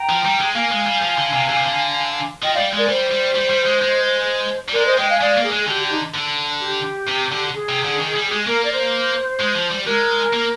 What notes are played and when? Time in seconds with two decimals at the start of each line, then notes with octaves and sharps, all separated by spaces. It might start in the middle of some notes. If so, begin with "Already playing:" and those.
Already playing: G5 A#5
0.09 F3
0.25 G3
0.40 G#3
0.55 A#3 F5 G#5
0.72 G#3
0.86 G3
1.02 F3
1.18 D3
1.33 C3
1.49 D3
1.57 C3
1.64 D3
2.42 F3 D#5 G5
2.54 G3 D5 F5
2.73 G#3 A#4 D5
2.88 G3 C5
3.12 G3
3.35 G3
3.50 G3
3.66 G#3
3.82 G#3
4.69 G3
4.74 G#3 A#4 D5
4.86 C5 D#5
4.98 G#3 D#5 G5
5.09 F5 G#5
5.21 G#3 D5 F5
5.37 A#3
5.44 G#4
5.52 G#3
5.62 G#4
5.67 D3 G4
5.80 G4
5.91 D#4
6.14 D3
6.60 G4
7.07 C3
7.31 D3
7.53 G#4
7.69 C3
7.85 D3
8.00 D#3
8.16 G3
8.32 G#3
8.47 A#3 A#4
8.63 D5
8.71 C5
9.40 G#3
9.55 F3
9.70 G3
9.86 G#3 A#4
10.33 A#3